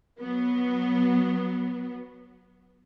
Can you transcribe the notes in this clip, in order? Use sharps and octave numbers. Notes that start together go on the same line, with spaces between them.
F#3 B3